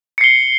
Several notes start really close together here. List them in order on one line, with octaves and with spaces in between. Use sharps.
C#7 C7 G7